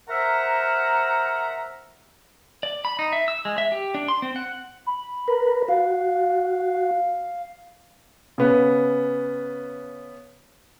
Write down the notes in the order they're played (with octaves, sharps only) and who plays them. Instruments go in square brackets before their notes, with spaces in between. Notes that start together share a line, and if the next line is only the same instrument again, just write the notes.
[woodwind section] A#4 C5 E5 F#5 A#5
[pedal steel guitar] D5
B5
D#4
E5
E6
G#3
E5
G4
D4
C6
C4
F#5
[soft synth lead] B5
[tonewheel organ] A#4 B4
[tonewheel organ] F#4 [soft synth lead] F5
[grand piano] C#3 B3